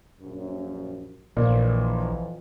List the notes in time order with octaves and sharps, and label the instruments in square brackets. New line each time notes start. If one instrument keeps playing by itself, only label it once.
[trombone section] A#1 F#2
[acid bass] A#1 [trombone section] F2 E3 F3 [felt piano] A#2